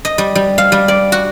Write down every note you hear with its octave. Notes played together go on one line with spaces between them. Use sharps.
D#5
G3
G3
F5
G3
D5
F#4